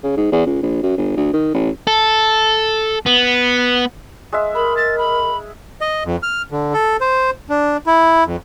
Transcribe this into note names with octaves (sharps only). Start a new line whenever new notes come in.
C#3
G#2
E2
C#2
A#1
F#2
G1
D2
D#3
A1
A4
B3
G#3 E5
A#4 B5
A6
B5
D#5
F2
F6
D3
A4
C5
D4
E4
F2